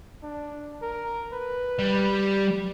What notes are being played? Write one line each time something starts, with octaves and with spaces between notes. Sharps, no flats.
D4
A#4
B4
G3